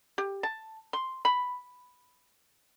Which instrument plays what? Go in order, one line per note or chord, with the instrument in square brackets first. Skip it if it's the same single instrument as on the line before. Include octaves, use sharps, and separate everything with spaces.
[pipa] G4
A5
C6
B5